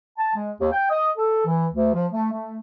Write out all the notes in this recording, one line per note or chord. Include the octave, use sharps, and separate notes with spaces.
A5
G#3
D#2
G5
D#5
A4
E3
D2
F3
A3
A3